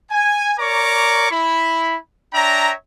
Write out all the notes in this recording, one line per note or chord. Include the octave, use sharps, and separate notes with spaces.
G#5
A#4 C#5 D5 A#5 C#6 D6
E4 B5
D4 C#5 E5 G5 A#5